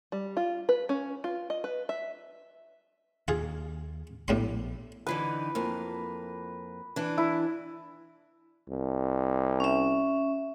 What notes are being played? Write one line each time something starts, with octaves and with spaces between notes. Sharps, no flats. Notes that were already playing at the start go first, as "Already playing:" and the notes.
G3
F4
B4
C#4
F4
D#5
B4
E5
D#2 F4 G#4
A#1 A2 G3 B3 C6
D3 E3 D#4 B4
F2 A#3
E3 D4
E4
C2
C#4 E5